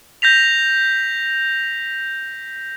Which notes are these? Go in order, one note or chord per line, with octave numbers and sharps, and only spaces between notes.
G6 A#6 B6 F7